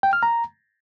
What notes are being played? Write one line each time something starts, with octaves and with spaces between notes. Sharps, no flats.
G5
F6
A#5